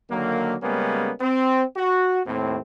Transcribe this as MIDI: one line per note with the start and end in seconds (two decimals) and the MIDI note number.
0.10 0.55 50
0.10 0.55 51
0.10 0.55 54
0.10 0.55 58
0.62 1.11 49
0.62 1.11 55
0.62 1.11 56
0.62 1.11 58
0.62 1.11 59
0.62 1.11 61
1.21 1.63 60
1.77 2.21 66
2.26 2.58 39
2.26 2.58 45
2.26 2.58 60